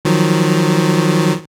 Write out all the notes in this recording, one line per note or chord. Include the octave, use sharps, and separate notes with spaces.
D#3 F3 F#3